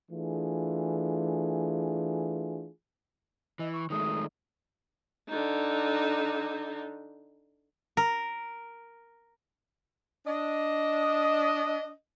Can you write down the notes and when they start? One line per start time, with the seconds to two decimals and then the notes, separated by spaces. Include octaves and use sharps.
0.11 E3 A3 D4 F4 G#4
3.59 E3 D#5
3.73 C#6
3.90 D#3 G#3 A3 D#6
5.29 D3 D#4
7.97 A#4
10.26 D4 D#5